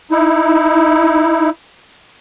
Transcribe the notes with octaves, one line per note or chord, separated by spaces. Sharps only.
D#4 E4